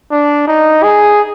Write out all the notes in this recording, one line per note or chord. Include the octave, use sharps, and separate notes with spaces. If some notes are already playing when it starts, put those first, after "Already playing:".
D4
D#4
G#4